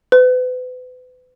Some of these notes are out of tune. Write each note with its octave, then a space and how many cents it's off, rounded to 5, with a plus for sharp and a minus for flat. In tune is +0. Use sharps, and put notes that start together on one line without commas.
B4 +35